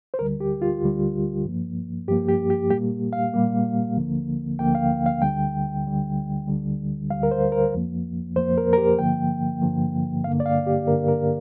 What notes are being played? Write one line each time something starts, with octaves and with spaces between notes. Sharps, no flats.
C5
D2 D3 G3 A#4
G4
F4
D2 D3 G3
G2 F3 A#3
G2 F3 A#3 G4
G4
G4
A#2 G3 A#3 G4
F5
A#2 G3 A#3
D2 D3 F3 A#3
D2 D3 F3 A#3 G5
F5
F5
D2 D3 G3 G5
D2 D3 G3
D2 D3 G3
D2 D3 G3 F5
A#4
C5
A#4
F2 F3 A#3
F2 F3 A#3 C5
A#4
A#4
G4
G2 D3 F3 A#3 G5
G2 D3 F3 A#3
G2 D3 A#3 F5
D5
F5
G4
G2 D3 A#3 A#4
A#4